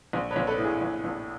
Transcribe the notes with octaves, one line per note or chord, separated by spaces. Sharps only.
A#1
B4 C#5
A#1
A4 B4
A2
G#4
A#1
A#1